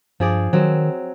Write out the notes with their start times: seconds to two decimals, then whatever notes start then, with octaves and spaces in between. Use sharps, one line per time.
0.20 G2 F3 G#4 D5
0.53 D#3 F#3 C4